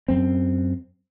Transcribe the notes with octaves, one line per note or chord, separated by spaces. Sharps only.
F#2 C4